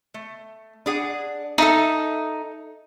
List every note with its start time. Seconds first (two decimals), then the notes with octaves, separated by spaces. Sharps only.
0.14 A3
0.86 D4 G#4 F#5
1.58 D#4 A4 E5 A5